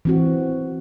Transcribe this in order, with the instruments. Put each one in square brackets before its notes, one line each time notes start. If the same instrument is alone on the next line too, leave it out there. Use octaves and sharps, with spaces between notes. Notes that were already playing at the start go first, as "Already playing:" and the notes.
[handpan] E3 C4 F#4